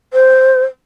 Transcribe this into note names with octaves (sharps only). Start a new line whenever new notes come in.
C5